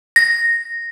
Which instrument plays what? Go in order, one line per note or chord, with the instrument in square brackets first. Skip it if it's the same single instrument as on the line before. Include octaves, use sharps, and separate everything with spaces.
[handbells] A#6